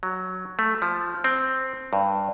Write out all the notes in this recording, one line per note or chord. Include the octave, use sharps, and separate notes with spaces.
F#3
A3
F3
C4
G2